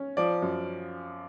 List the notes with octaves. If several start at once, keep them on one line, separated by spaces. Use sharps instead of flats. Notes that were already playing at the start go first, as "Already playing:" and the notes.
Already playing: C#4
F3 D5
F#2